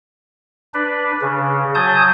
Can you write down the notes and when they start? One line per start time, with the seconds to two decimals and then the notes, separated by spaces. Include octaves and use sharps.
0.74 D4 B4
1.21 C#3
1.75 F#3 G#5 A5 D#6 G6